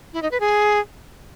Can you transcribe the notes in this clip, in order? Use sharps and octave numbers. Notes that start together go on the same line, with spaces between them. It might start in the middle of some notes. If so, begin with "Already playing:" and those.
E4
D#4
B4
G#4